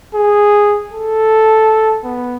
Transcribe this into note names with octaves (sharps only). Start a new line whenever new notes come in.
G#4
A4
B3